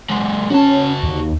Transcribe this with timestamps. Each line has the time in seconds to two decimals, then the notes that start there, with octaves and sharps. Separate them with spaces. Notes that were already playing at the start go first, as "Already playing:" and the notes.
0.10 F#3 G#3
0.50 C#4 F#4 A5
1.03 D#2